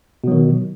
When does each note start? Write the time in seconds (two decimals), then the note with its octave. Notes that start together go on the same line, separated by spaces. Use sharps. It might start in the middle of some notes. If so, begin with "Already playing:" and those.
0.24 B2
0.27 F#3
0.31 D#3